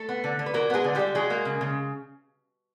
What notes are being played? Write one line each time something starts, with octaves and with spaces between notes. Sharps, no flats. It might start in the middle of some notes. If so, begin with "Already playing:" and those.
Already playing: A3 A4
B3
D3
D3
B4
F#3 A#3 A#4
G#3 B3 G#4
D3
D3 G3 G4
F#3 G#3 G#4
A#3
C#3
C#3